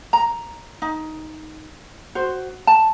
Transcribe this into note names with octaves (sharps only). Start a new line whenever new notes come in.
A#5
D#4
F#4 C5
A5